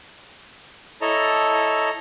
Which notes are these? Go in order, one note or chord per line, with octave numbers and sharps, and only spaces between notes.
E4 A4 C#5 D#5 A5 A#5